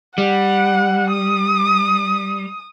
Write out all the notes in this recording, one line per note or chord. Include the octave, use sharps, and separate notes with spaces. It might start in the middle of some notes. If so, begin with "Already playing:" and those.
G3 F#5
D#6